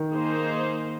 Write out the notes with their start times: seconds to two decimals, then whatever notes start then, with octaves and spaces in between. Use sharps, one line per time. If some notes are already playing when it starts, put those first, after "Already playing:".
Already playing: D#3
0.10 A#3 D#4 G#4 C5